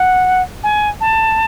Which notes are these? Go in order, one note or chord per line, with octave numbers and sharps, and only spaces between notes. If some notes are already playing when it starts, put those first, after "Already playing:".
Already playing: F#5
G#5
A5